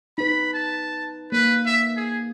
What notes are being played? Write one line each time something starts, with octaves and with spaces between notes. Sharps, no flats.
D#4 B4 B5
A5
A#3 B4
E5
G#4